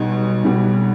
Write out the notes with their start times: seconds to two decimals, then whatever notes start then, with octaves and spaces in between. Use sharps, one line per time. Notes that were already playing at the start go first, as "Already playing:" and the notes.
Already playing: B1 B2 G3
0.44 B1 B2 G3